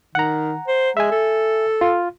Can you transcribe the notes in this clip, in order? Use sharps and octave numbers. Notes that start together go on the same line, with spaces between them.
D#3 F#5 A#5
C5
G#3 E5 G#5
A4
F4